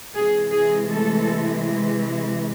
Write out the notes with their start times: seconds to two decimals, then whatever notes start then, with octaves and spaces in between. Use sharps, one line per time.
0.15 C3 E3 G#3 G#4
0.51 G#4
0.88 A3 A4